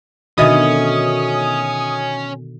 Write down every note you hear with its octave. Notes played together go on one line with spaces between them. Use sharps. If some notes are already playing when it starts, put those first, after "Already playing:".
B2 D3 D#3 C#4 F#4 D#5 E5 D#6